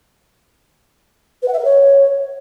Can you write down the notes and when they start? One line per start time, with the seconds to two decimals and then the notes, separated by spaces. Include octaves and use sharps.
1.42 B4
1.48 F#5
1.53 E5
1.59 A#4
1.64 C#5